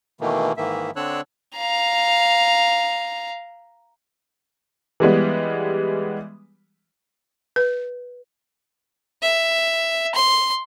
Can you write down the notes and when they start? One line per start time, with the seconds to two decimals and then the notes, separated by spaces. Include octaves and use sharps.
0.21 B2 D#3 E3 A3 A#3
0.57 G#2 D#3 E3 A#3 E5
0.96 D3 C4 D4 C#5 E6 F#6
1.57 F5 A#5
5.00 E3 G3 G#3 B3
7.56 B4
9.22 E5
10.15 C6